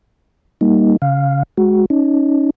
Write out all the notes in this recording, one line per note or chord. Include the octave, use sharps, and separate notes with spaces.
G3 A#3 D#4
C#3 F5
G#3 F#4
C#4 D#4